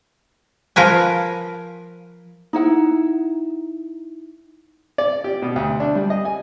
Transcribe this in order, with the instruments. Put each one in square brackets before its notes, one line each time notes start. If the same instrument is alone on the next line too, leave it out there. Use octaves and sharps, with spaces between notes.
[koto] F3 A#4 B4 G#5
[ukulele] D#4 E4 F#5
[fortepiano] D5
G4
B2
D2
D4
G3
D#5
G#5